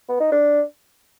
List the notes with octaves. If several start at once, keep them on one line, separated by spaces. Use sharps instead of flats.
B3
D#4
D4